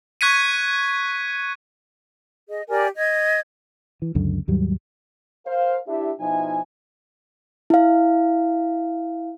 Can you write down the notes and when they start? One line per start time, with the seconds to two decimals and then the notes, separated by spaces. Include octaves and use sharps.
0.21 C#6 F#6 G#6 B6 C#7 D#7
2.48 G#4 D#5
2.69 G4 A#4 D5 G#5
2.97 D#5 G#6
4.02 E3
4.15 C#2 F#2 D3
4.48 D#2 G#2 F#3 G3
5.46 A#4 C5 F5
5.88 D4 E4 G4 E5
6.20 B2 F3 D#4 E4 E5 G#5
7.70 E4 F5